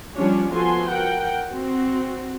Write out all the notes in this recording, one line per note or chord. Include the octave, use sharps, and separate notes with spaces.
F3 G3 C#4 D4 C#5
F3 B3 F#4 A4 G#5 C6
A#4 F#5 G5
C4 F#4